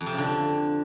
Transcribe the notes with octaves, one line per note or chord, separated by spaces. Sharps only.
F2
C3
C#3
D3